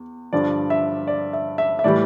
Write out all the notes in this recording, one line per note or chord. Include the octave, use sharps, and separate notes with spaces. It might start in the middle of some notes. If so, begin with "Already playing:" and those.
Already playing: E2
G2 D3 F3 D5
E5
D5
E5
E5
E5
A2 E3 G3 D5